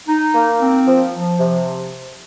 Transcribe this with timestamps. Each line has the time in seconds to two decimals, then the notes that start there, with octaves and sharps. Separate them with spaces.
0.08 D#4
0.34 A#3
0.61 C4
0.87 F3
1.14 F3
1.39 C3